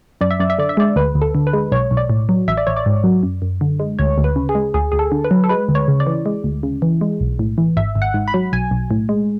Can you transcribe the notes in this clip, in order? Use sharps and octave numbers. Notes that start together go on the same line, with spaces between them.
F#2 D5
E5
F#2 D5
E5
D3 D5
E5
G#3 D5
D2 B4
D2
A4
D3
B4
G#3
B1 C#5
B1
D5
A2
F#3
A1 E5
D5
A1 C#5
D5
G#2
F#3
F#2
F#2
D3
G#3
D2 C#5
D2
B4
C#3
G#4
G#3
D2 G#4
D2 G#4
A4
D3
B4
F#3
A4
G#3 B4
D2
C#5
C#3
D5
E3
G#3
D2
C#3
E3
G#3
B1
A2
E3
G#1 E5
G#1
F#5
G#2
B5
F#3
B1 G#5
B1
A2
G#3